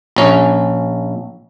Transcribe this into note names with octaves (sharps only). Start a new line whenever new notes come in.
A#1 C#4